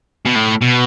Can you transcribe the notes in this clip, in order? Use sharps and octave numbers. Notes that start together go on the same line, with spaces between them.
B2
A2
B2